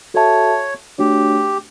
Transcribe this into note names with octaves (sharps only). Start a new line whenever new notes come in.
F#4 A4 C#5 E5 A5
A3 D4 F#4 G4 C#5